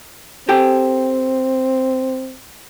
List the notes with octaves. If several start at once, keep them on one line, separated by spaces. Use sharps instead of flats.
C4 G4 A4 G5